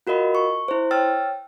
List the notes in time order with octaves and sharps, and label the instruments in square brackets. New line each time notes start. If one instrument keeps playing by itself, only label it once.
[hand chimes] F4 F#4 A#4 D#5 B5
C#6
E4 C5
C#5 G5 E6 F6 A6